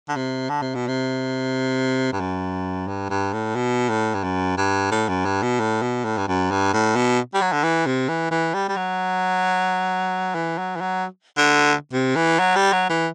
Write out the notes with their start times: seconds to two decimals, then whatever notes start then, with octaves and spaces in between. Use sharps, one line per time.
0.09 D3
0.16 C3
0.50 D3
0.62 C3
0.75 B2
0.88 C3
2.13 G2
2.21 F#2
2.88 G2
3.10 G2
3.33 A2
3.56 B2
3.89 A2
4.15 G2
4.24 F#2
4.58 G2
4.92 A2
5.09 F#2
5.25 G2
5.43 B2
5.60 A2
5.82 B2
6.05 A2
6.18 G2
6.28 F#2
6.51 G2
6.73 A2
6.96 B2
7.34 G3
7.42 F#3
7.53 D3
7.64 E3
7.86 C3
8.09 E3
8.31 E3
8.54 G3
8.69 G3
8.77 F#3
10.35 E3
10.58 F#3
10.76 E3
10.81 F#3
11.38 D3
11.93 C3
12.16 E3
12.39 F#3
12.56 G3
12.73 F#3
12.90 E3